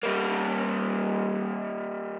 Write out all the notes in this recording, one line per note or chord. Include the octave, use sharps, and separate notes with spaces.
G3 A#3